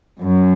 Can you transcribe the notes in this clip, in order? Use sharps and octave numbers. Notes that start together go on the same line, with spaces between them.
F#2